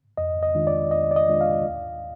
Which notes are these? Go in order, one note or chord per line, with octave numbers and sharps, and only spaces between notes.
F2 D#5
D#5
D#3 G#3 D4 F4
D5
F2 D#5
D5
D#5
D#3 G#3 D4 F4
F5
D#2